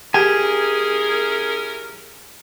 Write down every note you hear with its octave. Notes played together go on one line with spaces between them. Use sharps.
C#4 E4 G4 G#4 A#4 G#5